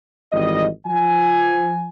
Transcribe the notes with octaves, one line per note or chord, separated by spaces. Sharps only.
G#1 E3 G3 D#5
F3 G#5